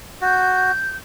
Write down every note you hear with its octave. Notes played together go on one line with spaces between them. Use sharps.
F#4 G6